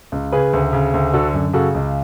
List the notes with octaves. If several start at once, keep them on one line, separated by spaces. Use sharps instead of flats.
C#2
C#3 G#4 B4
D2
C#3
D2
D3 F#4 A4
F#2
C#3 F#4 A4
C#2